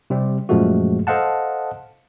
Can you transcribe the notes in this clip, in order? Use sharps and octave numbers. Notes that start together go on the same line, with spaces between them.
C3 G3 C4
F#2 A#2 F3 G#3 A3 F#4
A4 C5 D#5 F5 F#5 A5